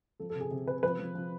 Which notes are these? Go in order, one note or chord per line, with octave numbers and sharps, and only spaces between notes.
F3 A4
A4
C3
G#4
C3
C3 B4
F3 B4
F3
F3